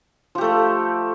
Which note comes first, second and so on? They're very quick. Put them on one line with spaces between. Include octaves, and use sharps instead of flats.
F3 G4 A3 A4